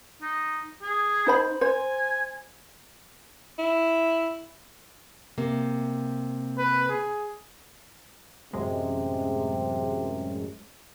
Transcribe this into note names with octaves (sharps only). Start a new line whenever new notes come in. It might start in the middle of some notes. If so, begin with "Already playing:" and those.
D#4
G#4
D#4 C5 B5
C5 G#5
E4
C3 A#3
B4
G#4
A1 F#2 C3 G#3